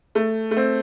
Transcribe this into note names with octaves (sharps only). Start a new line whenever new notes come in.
A3
A3
C4